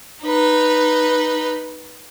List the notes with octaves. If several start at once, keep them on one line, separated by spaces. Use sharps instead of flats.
D#4 B4